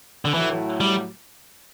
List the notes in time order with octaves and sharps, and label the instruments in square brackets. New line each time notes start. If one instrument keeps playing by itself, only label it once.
[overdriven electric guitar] D3
[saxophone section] A2 F#3 A3 [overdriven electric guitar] E3
[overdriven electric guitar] G3